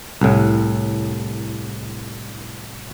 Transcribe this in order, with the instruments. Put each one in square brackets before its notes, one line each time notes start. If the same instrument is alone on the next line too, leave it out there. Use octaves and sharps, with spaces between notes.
[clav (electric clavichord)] C2 A2